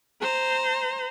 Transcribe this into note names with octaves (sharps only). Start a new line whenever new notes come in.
C5 A#5